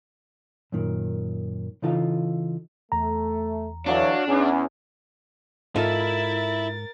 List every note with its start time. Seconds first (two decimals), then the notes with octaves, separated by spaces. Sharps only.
0.72 F#2 A#2 D#3
1.82 C#3 E3 D#4 F4 A4 F5
2.92 E2 A3 A#5
3.86 D3 E3 F#3 D4 F#4 C#5 F5
4.27 E2 C#4
5.76 G#2 E4 F4 A4 A#4 D#5 E5 A6